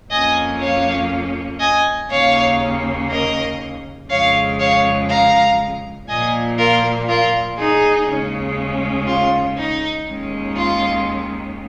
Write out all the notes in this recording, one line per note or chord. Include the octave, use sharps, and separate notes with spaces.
F2 F3 A#3 C#4 D#5 G#5
C#5 F5
D#5 G#5
D#2 C#3 A#3 C#4 C#5 F5
A#4 D#5
F2 C#3 G#3 C#5 F5
C#5 F5
F5 A#5
A#2 F3 A#3 D#5 G#5
F4 A#4
F4 A#4
D#4 G#4
D#2 C#3 G#3 C#4
F4
D#4
D#2 D#3 G#3 C#4
F4